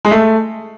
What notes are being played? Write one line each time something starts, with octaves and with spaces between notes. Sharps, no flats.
G#3
A3